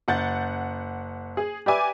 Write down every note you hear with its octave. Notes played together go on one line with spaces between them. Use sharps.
F#1 F#5 G6 A6
G#4
G4 B4 D5 E5 G#5 D6